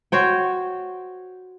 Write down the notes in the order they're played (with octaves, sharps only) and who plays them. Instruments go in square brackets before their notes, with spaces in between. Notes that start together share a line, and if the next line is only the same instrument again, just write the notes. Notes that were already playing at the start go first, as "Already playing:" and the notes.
[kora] F#4 C5 C#5 G5